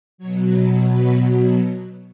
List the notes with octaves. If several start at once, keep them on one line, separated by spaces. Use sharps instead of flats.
B2 F#3 C#5
B4
B4